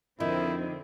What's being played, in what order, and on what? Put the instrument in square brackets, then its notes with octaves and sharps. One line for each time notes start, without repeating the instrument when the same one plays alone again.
[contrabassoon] F2 [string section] D3 C4 [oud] D#3 [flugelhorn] E4